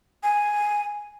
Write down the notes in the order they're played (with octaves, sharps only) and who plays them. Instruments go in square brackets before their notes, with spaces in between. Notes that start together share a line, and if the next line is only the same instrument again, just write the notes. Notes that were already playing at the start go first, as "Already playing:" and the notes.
[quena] G#5